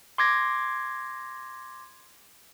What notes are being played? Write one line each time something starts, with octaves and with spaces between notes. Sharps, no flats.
C6 D6 G#6 A#6